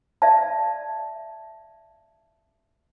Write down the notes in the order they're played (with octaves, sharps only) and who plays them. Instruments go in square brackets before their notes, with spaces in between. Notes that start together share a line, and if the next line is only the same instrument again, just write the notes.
[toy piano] D5 E5 F5 A5